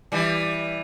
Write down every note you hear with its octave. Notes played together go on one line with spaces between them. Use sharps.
E3 G3